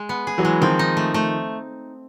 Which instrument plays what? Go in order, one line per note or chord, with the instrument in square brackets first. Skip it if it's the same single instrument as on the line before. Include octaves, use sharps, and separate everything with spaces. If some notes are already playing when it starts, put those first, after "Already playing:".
Already playing: [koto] G#3
B3
G#4
[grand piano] E3 F#3
[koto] G#3
[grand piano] D#3 F3 [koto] C4
[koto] D#4
A3
A3